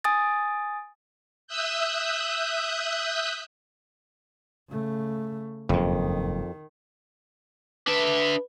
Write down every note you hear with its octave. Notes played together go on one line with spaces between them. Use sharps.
G#5 D#6 A6
E5 D#6 E6 F#6 G6
C#3 A3
F#1 F2 G#2 D#3
D4 B4 E5